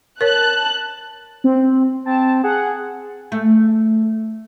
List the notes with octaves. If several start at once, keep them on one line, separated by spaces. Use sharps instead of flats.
A#4 C#5 A5 F#6
C4
C4 A5
G#4 F#5
A3